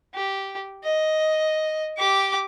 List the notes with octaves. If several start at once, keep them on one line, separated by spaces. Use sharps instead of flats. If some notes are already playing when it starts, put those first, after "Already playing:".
G4
D#5
G4 D6